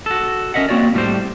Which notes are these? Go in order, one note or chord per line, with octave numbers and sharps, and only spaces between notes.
F#4 A4
C#4 A#4 D#5 E5 F#5
A#3 C4 D#4 F#4 C#5 D5
A2 G3 C4 C5